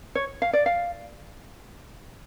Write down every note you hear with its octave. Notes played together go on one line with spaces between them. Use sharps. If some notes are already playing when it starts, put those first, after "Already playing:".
C#5
F5
D5
F5